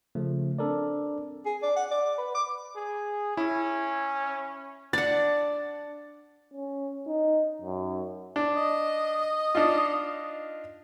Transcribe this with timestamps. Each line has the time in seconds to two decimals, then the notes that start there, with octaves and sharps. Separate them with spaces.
0.15 C#3 F3 A3
0.59 C4 D4 A4 A#4 D5
1.46 G#4
1.63 D5
1.76 F#5
1.91 D5
2.18 B4
2.35 D6
2.76 G#4
3.37 C#4 E4
4.93 D4 D5 F#5 A6
6.53 C#4
7.07 D#4
7.61 F#2
8.36 D4
8.56 D#5
9.55 D4 D#4 F4